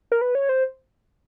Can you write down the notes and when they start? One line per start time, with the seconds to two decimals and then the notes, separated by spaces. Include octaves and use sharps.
0.12 A#4
0.21 B4
0.35 C#5
0.49 C5